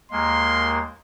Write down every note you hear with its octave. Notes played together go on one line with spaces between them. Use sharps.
D#2 G#3 A#3 C6